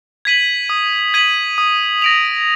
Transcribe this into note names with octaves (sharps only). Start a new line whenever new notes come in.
G#6 B6 D#7 F#7
D#6
G#6 B6 D#7 F#7
D#6
A#6 D7 F7